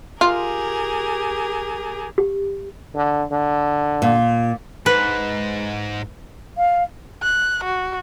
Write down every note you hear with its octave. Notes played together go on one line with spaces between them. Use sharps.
F4 G4 G#4 A#4
G4
D3
D3
A#2
G#2 B4
F5
F#6
F#4